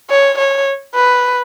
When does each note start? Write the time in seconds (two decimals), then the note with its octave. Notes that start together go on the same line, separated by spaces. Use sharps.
0.10 C#5
0.38 C#5
0.95 B4